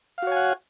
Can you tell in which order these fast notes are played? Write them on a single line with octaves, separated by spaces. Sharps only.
F5 F#4 C#5 G#5 F#5